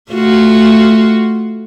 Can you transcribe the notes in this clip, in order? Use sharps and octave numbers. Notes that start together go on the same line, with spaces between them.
A3 F4 F#4